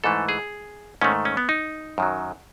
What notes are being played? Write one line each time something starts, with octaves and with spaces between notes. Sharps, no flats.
G#2 E3 A3 A4
G#4
G#2 D#3 A3 C#4
C#4
B3
D#4
F#2 D#3 F#3